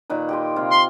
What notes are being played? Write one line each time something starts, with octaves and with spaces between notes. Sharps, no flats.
A#2 D#3 B4
G4 D#5 C6
C3 F4
C6